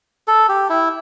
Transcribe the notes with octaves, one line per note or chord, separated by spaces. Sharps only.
A4
G4
E4